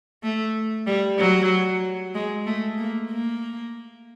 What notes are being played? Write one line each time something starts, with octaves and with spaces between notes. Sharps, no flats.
A3
G3
F#3
G#3
A3
A#3
A#3